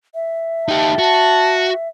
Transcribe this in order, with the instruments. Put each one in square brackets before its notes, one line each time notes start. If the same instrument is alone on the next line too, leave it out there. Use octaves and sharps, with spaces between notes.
[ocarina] E5
[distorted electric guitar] D#4 G4 [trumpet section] A5
[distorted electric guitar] F#4